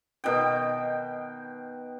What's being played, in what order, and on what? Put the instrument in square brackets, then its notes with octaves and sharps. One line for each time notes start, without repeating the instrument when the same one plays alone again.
[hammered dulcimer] B2 D#3 G5